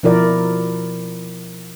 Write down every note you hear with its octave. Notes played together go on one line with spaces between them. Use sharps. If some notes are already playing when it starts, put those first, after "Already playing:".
B2 F3 E4 A#4 D5